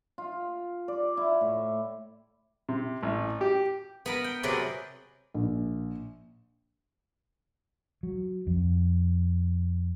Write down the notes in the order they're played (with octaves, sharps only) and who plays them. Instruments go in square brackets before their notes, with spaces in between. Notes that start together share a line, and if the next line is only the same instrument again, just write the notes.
[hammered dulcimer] F4
D5
E4
A2
[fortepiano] C3
A1
G4
[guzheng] B3 A#4 B5
G5
C3 F#3 G#3 A#4 B4 D5
[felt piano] A#1
[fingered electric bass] F#3
F2